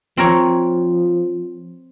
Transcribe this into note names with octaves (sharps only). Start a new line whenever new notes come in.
F3 C4 A#4 C#5